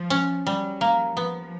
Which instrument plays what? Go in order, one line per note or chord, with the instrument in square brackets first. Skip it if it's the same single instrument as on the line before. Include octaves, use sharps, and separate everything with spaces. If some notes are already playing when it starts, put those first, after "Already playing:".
Already playing: [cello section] F3
[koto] C#4
[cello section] F#3 [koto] G3
[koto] A#3
[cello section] F3 [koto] B3